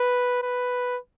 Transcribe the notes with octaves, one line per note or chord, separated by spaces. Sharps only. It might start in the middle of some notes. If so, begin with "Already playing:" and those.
Already playing: B4
B4